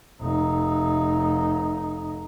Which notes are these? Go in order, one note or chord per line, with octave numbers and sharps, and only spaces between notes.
F1 D#4